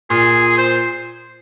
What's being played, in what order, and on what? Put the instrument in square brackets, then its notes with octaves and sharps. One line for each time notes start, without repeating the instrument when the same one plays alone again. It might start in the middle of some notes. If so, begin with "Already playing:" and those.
[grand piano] A#2 [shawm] G#4
[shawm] C5